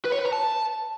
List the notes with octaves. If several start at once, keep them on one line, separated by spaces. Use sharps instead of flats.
B4
C#5
B4
A#5
A5